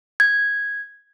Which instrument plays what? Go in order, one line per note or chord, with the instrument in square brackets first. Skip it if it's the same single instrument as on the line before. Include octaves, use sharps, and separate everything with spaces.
[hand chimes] G#6